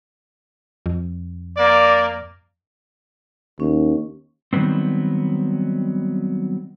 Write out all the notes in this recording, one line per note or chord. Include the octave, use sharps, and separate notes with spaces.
F2
A#3 D5
D#2 C#4
D#3 F#3 G3 B3 C4